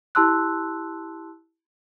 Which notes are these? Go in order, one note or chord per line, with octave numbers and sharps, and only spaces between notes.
E4 G4 A5 C6 E6 F#6